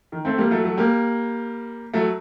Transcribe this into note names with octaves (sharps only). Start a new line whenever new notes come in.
D#3
A3 C4
G3 A#3
F#3 A3
F#3 A3
G3 A#3
F#3 A3